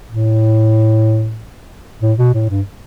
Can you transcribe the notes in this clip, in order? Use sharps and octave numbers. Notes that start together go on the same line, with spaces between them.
A2
A2
B2
A2
G2